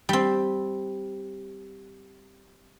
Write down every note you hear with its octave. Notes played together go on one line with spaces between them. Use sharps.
G3 C4